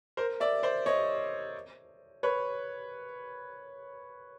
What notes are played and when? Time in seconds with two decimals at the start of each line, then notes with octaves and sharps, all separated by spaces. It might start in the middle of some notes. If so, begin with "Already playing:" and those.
0.17 A#4 C5
0.40 D5 E5
0.63 C5 D5
0.86 C#5 D#5
2.23 B4 C#5